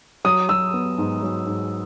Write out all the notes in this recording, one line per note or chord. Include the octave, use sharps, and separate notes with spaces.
F#3 D#6
F#3 E6
B3
G#2
F#3
G#2